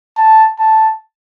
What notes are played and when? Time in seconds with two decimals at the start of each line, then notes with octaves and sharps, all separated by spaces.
0.17 A5
0.59 A5